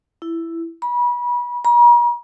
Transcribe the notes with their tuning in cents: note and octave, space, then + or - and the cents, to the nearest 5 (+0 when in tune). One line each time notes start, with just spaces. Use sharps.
E4 +10
B5 -30
A#5 +45